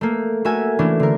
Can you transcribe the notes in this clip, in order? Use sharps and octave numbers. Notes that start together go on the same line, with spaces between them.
A3 A#3
A3 F#4 A#4 E5 G#5
E3 A3 C#4 D4 E4
D3 A#4